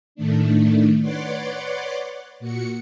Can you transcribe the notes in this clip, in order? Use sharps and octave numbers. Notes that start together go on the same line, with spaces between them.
A2 D#3 A3 D4
B4 C#5 D5 F#5 C6 D6
A#2 F#4 C#7